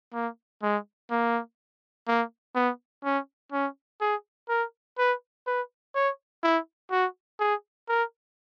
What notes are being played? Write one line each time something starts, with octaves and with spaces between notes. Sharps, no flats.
A#3
G#3
A#3
A#3
B3
C#4
C#4
G#4
A#4
B4
B4
C#5
E4
F#4
G#4
A#4